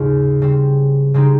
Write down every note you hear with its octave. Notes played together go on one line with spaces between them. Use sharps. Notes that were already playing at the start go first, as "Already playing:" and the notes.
Already playing: D#2 G#2 C#3 G#3 C#4 F4
C#3 G3 C4
C#3 G#3 C4 D#4 G4